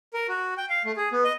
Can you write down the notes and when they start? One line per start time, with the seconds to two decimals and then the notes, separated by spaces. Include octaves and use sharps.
0.13 A#4
0.29 F#4
0.57 G5
0.70 F5
0.85 A3
0.97 G#4
1.12 B3
1.24 D#5